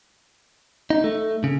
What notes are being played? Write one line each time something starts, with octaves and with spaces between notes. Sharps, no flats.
D#4
A3
C#3